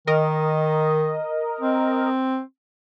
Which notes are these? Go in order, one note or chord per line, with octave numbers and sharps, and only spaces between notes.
D#3 A#4 D#5
C4